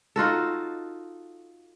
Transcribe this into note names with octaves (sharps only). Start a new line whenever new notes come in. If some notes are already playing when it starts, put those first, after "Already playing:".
D#4 F4 F#4 A4